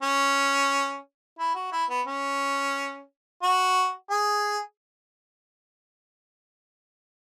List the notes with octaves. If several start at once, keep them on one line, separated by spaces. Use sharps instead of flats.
C#4
E4
F#4
E4
B3
C#4
F#4
G#4